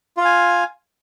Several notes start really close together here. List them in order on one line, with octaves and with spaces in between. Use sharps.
F4 F5 G#5